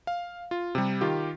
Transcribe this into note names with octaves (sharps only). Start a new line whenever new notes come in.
F5
F4
C3 G3
D#3 F4 G4